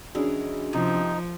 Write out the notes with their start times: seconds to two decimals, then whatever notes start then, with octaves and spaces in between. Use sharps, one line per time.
0.15 E3 G#3 C#4 D4 F#4 A#4
0.73 C3 F3 D#4